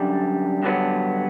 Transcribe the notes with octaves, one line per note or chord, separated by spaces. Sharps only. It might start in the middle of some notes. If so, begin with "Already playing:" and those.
Already playing: F#2 D3 G3 D4
G2 D3 F#3 B3